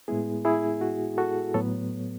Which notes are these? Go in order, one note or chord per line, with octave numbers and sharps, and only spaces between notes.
A2 G#3 B3 E4 G#4
E4 G#4
F#4
F#4 A4
A2 F#3 B3 A4 C#5